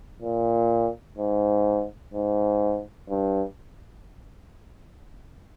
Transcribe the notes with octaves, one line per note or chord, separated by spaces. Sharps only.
A#2
G#2
G#2
G2